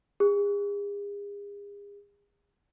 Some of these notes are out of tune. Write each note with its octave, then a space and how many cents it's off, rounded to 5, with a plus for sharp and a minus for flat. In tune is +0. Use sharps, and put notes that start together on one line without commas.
G#4 -40